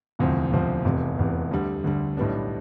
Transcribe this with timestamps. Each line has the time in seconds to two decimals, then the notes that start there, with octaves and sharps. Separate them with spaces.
0.19 E1 D2 C3 F3 C4
0.52 E1 D2 C3 F3 C4
0.85 F1 E2 C3
1.18 F1 E2 C3
1.51 D2 D3 G3
1.84 D2 D3 G3
2.17 B1 A2 G3 B3 D4